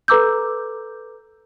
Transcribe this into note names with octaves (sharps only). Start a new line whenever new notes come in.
A4 B4 A#5 D6 E6 G6